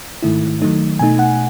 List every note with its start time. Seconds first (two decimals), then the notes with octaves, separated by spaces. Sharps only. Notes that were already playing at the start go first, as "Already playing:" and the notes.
0.23 G#2 D#3 A3 E4
0.61 D#3 F#3 A3 D#4
0.99 B2 A3 D#4 G#5
1.19 F#5